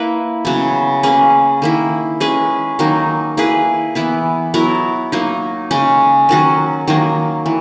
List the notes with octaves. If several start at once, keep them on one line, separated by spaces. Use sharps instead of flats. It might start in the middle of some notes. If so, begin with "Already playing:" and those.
Already playing: A#3 E4 B4
C#3 F#3 B3
A#3 C#4 G#4 B4
D#3 A#3 E4
G#3 C#4 G#4 B4
D#3 F#3 A#3 D#4
A#3 E4 G#4 B4
E3 B3 E4
F#3 B3 E4 A#4
F#3 A#3 D#4
C#3 G#3 C#4
D#3 F#3 C#4 F#4
D#3 F#3 A#3
E3